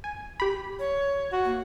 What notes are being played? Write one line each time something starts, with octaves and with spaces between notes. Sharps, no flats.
G#5
G4 B5
C#5
F#4
A#3